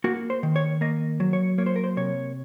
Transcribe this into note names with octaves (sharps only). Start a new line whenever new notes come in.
A#3 F#4
C5
D#3
C#5
A#3 D#5
F#3
C#5
A#3 C#5
C5
A#4
C5
C3 C#5